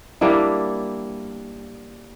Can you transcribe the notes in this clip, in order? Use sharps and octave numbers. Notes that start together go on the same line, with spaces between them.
G3 A#3 D4 E4